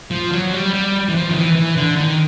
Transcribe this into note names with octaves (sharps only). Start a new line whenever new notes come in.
F3
F#3
G3
G3
E3
F3
D#3
E3
E3
D3
D#3